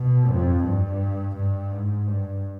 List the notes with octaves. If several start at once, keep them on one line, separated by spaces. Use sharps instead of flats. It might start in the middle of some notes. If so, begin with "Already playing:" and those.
Already playing: B2
F2
G2
G2
G#2
G2